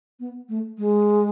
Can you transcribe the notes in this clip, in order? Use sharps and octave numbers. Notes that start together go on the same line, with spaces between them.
B3
A3
G#3